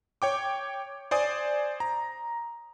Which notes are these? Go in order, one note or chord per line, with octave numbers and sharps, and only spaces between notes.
C#5 G5 D6
C5 D5 G#5 D#6
A#5